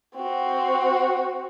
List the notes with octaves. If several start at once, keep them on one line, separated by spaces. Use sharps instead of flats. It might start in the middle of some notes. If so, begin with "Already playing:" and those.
C4 F#4